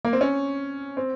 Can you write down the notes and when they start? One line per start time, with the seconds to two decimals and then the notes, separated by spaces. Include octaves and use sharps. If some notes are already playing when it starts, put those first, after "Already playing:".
0.05 A#3
0.13 C4
0.21 C#4
0.97 C4